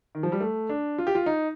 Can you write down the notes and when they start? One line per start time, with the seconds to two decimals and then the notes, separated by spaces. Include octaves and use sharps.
0.15 D#3
0.23 F3
0.32 G3
0.40 A3
0.69 D4
0.98 F4
1.07 G4
1.15 F4
1.26 D#4